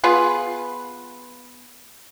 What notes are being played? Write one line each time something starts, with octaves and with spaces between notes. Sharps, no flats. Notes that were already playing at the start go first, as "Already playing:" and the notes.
B3 F4 G#4 B4